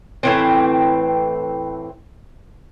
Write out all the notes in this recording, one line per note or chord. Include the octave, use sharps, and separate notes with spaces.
A2 E3 C4